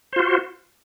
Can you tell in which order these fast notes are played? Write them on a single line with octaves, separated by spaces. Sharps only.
C5 F4 F#4